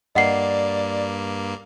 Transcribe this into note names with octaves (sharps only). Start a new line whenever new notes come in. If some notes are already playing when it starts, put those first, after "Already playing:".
G2 A#3 D5 D#5 F#5 C7